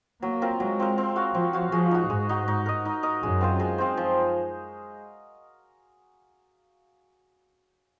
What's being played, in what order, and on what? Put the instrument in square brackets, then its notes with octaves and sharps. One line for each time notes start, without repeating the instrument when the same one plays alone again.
[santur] F#3 [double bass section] A#3
[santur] C4 F4 A#4
[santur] F#3 [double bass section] G#3
[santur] C4 F4 A#4
C4
F#4 C#5 F5
[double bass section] F3 [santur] C4
[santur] F#4 C#5 F5
[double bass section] F3 [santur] G#3
[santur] D#4 F#4
[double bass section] G#2 [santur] G#3
[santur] D#4 F#4
D#4
A#4 D#5
D#4
A#4 D#5
[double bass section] F#2 [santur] G#3
[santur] C4 F4 C5
G#3
C4 F4 C5
F3